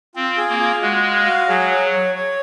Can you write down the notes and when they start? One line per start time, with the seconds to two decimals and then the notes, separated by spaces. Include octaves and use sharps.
0.15 C4 F4
0.37 G#4
0.49 A#3
0.60 F4
0.82 G#3 F#4
1.04 F5
1.27 F#4
1.48 F#3 G#4
1.71 C#5
1.92 C#5
2.15 C#5